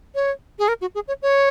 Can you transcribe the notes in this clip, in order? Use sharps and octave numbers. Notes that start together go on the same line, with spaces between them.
C#5
G#4
A#4
F#4
G#4
C#5
C#5